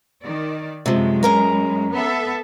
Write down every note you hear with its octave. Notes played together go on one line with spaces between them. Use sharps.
D#3 D5
F#2 C3 F3 G#3
C#4 A#4 A#5
B3 A4 E5